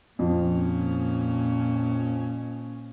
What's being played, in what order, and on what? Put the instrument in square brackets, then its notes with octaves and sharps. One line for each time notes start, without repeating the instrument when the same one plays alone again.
[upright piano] F2 F3 [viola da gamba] A#2 C#4